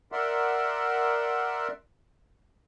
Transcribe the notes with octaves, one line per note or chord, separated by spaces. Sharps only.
A#4 D5 E5 F#5 C6